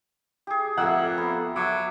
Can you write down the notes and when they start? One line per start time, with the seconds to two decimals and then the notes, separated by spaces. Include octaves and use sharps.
0.47 G4 G#4
0.77 F2 A3 A#3 F#5 E6
1.18 B3
1.56 F#3 E5 D6